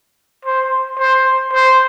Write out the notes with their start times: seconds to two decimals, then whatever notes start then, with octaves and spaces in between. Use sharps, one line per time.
0.45 C5
0.98 C5
1.53 C5